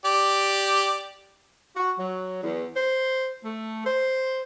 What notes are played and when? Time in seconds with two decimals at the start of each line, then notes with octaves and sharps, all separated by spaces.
0.05 G4 D5
1.76 F#4
1.97 F#3
2.42 E2
2.75 C5
3.42 A3
3.85 C5